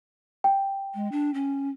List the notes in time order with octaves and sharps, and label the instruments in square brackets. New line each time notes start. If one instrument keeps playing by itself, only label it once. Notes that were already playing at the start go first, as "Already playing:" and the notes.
[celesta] G5
[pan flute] G#3
D4
C#4